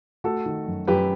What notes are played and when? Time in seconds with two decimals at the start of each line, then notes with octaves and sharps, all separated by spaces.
0.24 A3 F#4 A4
0.46 D#3
0.67 F#2
0.87 F#2 G4 B4